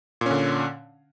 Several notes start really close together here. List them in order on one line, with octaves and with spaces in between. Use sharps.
A#2 C#4 D3